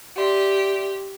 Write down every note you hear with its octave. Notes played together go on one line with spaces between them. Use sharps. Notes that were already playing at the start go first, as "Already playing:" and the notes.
G4 D5 E5 C6